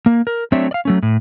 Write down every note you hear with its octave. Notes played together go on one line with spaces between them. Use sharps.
A#3
A#4
F#3 A3 C4 D4 C#5 E5
D5 F5
F#3 A3 C#4
A2